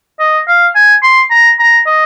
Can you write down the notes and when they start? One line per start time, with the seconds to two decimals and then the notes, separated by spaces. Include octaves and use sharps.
0.20 D#5
0.48 F5
0.75 G#5
1.03 C6
1.31 A#5
1.60 A#5
1.87 D#5